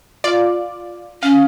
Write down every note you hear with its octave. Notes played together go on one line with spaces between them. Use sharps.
F4 D5
C#4 F5